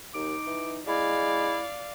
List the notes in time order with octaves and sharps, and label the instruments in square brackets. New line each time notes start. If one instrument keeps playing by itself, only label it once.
[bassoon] D#2 [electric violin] D#4 [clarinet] D6
[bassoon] E3
[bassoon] G#3 [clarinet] E4 [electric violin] D5 F5